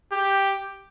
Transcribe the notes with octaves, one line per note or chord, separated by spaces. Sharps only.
G4